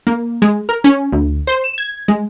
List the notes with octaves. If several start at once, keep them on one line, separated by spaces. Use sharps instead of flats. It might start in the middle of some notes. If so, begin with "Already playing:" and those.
A#3
G#3
A#4
C#4
D2
C5
E7
G#6
G#3